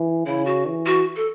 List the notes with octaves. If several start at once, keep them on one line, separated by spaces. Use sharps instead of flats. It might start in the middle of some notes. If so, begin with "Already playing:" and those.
Already playing: E3
C#3 E4
F#4
E3
F#4
A4